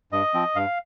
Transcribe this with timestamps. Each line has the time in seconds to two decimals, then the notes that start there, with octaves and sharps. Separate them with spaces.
0.12 G2 D#5
0.34 F3 C4
0.56 G2 F5